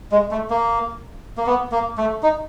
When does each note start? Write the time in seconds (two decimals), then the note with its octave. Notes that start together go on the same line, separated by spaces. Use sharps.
0.12 G#3
0.31 A3
0.50 A#3
1.37 A#3
1.46 B3
1.72 A#3
1.98 A3
2.23 D#4